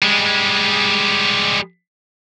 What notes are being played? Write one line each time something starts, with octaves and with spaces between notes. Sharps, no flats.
G3 G#3